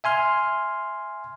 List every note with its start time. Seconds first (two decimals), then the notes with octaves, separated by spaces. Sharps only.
0.04 E5 G#5 C6 F6